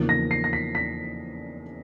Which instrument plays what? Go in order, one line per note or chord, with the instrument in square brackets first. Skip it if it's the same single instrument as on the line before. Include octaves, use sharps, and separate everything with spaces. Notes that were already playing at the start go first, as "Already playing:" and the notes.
Already playing: [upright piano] E2 C#3 F3 A#3 D#4
A#6
C7
A#6
B6
B6